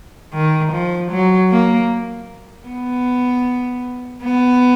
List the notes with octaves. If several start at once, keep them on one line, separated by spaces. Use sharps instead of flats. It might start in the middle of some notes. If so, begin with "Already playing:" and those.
D#3
F3
F#3
A#3
B3
B3